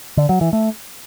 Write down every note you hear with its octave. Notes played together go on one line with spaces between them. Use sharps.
D3
F#3
E3
A3